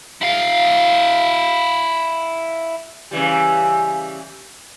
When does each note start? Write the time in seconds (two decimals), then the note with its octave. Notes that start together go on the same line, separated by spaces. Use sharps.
0.21 E4 F5
3.11 C#3 E3 G3